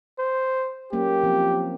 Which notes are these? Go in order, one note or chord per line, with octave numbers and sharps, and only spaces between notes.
C5
F#3 A#3 C#4 G4
F3 C4